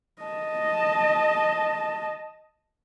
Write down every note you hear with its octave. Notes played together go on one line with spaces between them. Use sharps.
D#5 A5